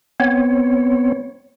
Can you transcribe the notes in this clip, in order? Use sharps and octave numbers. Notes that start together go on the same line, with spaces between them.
B3 C4 C#5